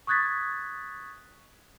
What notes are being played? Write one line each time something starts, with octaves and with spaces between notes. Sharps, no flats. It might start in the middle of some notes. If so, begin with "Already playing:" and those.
C#6 D#6 F#6 G#6 A6 B6